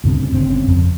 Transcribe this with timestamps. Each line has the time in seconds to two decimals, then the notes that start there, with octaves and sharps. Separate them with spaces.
0.04 D2 G2 C#3 C4
0.34 G1 C#3 C4
0.67 F2